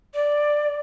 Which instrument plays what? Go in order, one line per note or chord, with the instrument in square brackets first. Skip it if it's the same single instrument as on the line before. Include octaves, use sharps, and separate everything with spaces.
[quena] D5